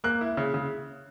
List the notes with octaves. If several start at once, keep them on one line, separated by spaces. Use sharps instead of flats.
A#3 F#6
E4
C#3
C#3